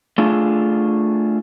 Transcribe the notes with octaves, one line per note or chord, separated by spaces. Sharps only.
A3 D4 F4 G#4